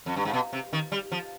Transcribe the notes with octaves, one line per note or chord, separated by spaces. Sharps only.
F2
G2
G#2
B2
C3
D#3
G3
F3